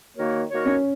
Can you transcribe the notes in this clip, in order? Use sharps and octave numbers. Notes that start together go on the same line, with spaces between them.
D#3 A#3 F#4 A#4 C#5
D#3 A#3 F#4 A#4 C#5
C#4